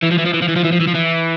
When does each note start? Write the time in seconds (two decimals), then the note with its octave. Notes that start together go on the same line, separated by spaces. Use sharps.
0.02 E3
0.11 F3
0.18 E3
0.25 F3
0.34 E3
0.42 F3
0.48 E3
0.56 F3
0.64 E3
0.72 F3
0.80 E3
0.87 F3
0.95 E3